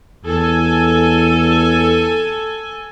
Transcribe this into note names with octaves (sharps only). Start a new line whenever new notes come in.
E2 A4 G#5